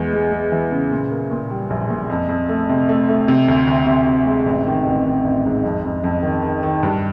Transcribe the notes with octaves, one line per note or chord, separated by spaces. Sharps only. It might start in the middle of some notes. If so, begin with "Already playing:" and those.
Already playing: E2 G#3
G#3
G#3
E3
C#3
A#2
A#3
A#2
G3
A#1
A#2
F2
F2
A3
C3
A3
A3
C3
D2
D2
C3
C3
G#3
A1
D#3
A1
D#3
A1
G#2
F2
F2
F2
D#3
D#3
D#3
G2